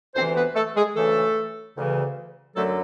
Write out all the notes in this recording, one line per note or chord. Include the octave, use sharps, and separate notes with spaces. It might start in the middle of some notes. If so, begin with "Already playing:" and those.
D2 C3 E3 C4 C5
B3 B4
A3 A4
G#3 G#4
D2 C#3 E3 A3 A4
D2 C#3 E3
F#2 D3 F#3 A3 A4